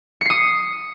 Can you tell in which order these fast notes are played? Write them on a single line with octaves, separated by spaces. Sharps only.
C#7 C7 D#6